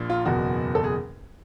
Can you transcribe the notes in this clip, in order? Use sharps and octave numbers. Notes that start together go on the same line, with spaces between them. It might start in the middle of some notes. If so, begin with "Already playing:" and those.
Already playing: A#1 A#2
F4
F#1 E2 B2 F#4
A4
G#4